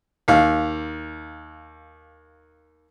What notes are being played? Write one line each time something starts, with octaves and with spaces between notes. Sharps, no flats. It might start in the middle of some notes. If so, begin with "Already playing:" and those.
D#2 F5